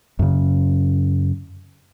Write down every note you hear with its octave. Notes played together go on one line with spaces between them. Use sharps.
F#2 C#3